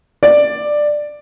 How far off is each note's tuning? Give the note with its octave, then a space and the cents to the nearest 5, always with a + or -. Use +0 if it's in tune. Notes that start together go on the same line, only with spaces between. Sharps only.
D5 +10